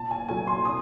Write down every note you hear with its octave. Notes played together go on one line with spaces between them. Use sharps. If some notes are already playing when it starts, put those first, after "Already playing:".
Already playing: A#2 A5
G#5
F#3 A3 G#5
C6
C3 D#6